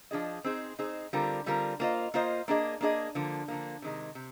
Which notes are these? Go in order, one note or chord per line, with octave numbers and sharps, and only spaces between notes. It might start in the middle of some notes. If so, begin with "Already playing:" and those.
F3 G#3 D4 G#4 D#5
C4 D#4 G#4 C5
C4 D#4 G#4 C5
D3 G3 C4 F4 A#4
D3 G3 C4 F4 A#4
A#3 F4 C5 D#5
A#3 F4 C5 D#5
A#3 D4 G#4 D#5
A#3 D4 G#4 D#5
D3 F3 A#3
D3 F3 A#3
C3 D#3 G#3
C3